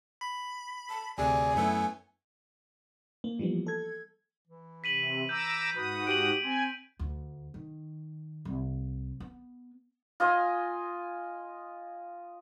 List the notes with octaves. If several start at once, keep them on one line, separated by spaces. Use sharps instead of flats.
B5
A5
D2 C3 G#4 D5 G#5
F#2 A3 B3 E4
A#3
E3 F3 G3 A#3 B3
A4 G#6
E3
C3 B6 D#7 F#7
A#5 D6 E6 G6
G#2 F#4 B4 D#6
G4 D7 D#7 F#7
C4 G#5
D2
D#3
C2
B3
F4 D#5 G#5